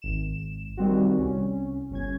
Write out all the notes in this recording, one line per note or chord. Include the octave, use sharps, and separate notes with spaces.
G#1 E7
D#3 G3 C4 F#4
C2 C#4
G1 C#4 G#6